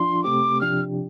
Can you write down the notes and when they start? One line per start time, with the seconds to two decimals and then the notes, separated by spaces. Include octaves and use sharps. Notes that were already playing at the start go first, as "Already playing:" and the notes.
Already playing: F3 D4 F4 C6
0.24 C3 A3 C4 G4 D6
0.61 C3 F3 D4 G4 F6